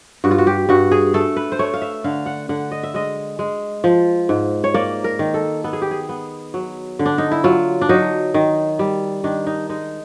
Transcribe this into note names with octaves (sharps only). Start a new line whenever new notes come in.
G2 F#4
F4
F#4
G4
G2 F#4
G#4
A3 A4
B4
C5
A3 C#5
F5
E5
D3 F5
F#5
D3 F#5
D#5
E5
G#3 D#5
G#3
F3
G#2
C#5
A#3 D5
A#4
D#3
A4
B3 A4
G#4
G4
G#4
B3
F#3
D3
D4
D#4
E4
F#3 F4
D4
F#3 D#4
D#3
G3
D#3 D4
D#4
G#3 D#4